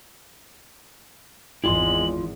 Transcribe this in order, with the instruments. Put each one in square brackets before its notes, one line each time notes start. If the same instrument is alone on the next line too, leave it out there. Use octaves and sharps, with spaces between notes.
[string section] G#1 E2 [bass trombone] G#3 [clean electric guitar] E4 F4 C6 [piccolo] F#7